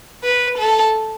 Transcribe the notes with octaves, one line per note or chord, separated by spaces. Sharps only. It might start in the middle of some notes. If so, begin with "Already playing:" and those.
B4
A4